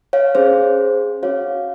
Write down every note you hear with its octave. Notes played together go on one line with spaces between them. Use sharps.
C#5 F5
C#4 G#4 C5
C#4 F#4 C#5 F5